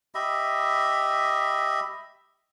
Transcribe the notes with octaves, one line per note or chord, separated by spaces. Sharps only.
G4 D#5 E5 B5